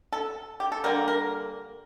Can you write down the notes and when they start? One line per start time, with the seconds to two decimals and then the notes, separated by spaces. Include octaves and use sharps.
0.13 A4
0.60 G4
0.72 A4
0.84 D3 G3 A#3 A#4
1.08 A#4